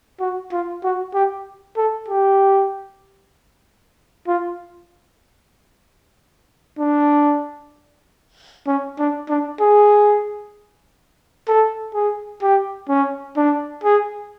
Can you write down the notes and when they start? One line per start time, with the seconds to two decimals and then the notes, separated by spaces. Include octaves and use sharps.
0.20 F#4
0.52 F4
0.83 F#4
1.14 G4
1.77 A4
2.09 G4
4.27 F4
6.79 D4
8.67 C#4
8.98 D4
9.29 D4
9.61 G#4
11.48 A4
11.95 G#4
12.42 G4
12.89 C#4
13.37 D4
13.84 G#4